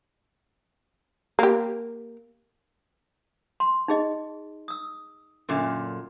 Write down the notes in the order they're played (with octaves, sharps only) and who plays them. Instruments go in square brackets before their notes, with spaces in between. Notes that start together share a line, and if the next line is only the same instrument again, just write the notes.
[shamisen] A#3 G4
[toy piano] C6
D#4 G#4 D#5
D#6 E6
[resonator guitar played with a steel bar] F#2 A#2 D3